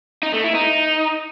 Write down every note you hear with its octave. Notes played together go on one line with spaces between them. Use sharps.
D#4
A3
E4
D#4